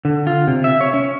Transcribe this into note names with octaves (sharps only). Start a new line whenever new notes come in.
D3
F4
C3
E5
C#5
C#4